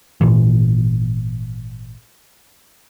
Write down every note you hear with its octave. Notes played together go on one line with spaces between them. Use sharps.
G#1 A#2 E3